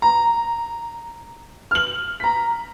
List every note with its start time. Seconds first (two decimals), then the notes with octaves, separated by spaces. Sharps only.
0.02 A#5
1.71 F6 F#7
2.20 A#5 B6